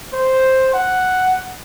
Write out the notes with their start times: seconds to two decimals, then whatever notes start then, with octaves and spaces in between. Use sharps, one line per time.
0.13 C5
0.73 F#5